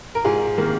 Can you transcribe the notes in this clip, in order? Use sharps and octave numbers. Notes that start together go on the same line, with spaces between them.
A#4
G#2 F4 G#4
D#3 A#3